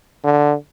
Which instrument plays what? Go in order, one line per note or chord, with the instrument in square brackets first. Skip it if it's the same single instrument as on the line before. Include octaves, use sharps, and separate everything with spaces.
[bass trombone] D3